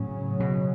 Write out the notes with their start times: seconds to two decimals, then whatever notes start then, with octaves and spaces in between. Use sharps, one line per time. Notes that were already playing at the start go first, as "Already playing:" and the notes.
Already playing: A2 C#3 F#3 C#4
0.40 B2